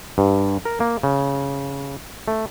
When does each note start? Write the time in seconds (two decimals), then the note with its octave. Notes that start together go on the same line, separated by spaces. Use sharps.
0.18 G2
0.65 A#4
0.80 A#3
1.03 C#3
2.28 A3